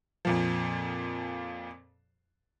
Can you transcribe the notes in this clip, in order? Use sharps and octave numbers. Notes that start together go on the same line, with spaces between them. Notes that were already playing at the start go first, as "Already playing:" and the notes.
F2 A#2 F3